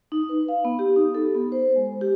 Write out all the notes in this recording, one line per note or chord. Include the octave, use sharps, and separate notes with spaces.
D#4
B4
F5
B3
G4
D#4
A4
B3
C5
G#3
G4